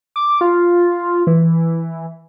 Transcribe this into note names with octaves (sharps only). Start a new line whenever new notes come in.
D6
F4
E3